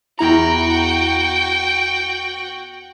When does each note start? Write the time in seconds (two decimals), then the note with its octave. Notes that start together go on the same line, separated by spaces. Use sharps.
0.19 E2 E4 F#4 G5 A#5